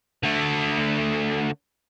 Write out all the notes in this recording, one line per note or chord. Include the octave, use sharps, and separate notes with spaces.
D3 A3